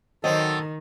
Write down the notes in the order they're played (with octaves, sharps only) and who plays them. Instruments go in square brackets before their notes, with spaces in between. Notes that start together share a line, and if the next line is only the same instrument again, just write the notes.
[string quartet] D#3 [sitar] F#3 C4 [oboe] A4 [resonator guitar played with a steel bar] D#5